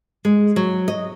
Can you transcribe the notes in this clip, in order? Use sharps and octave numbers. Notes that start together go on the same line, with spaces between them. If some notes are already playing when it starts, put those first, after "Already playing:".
G#3
F#3
D#5